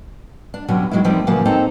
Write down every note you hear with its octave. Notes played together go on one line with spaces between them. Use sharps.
D4
D#2 B2 D3 F#3 C#4
D#3 F#3 G#3 A#3 E4
D#3 F3 G3 A#3 C4
A#2 C#3 F3 F#3 A#3
C4 D#4 A4 C5 A5 A#5